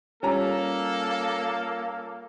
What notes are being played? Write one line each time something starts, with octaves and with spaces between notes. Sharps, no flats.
G3 A#3 C#4 F4 A4 A#5